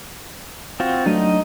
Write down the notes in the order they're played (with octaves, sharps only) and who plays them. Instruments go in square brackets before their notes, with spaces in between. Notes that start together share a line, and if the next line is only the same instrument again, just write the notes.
[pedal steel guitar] C4 F4 F#4
[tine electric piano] F#3 A3 D4 [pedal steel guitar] D#4 D#5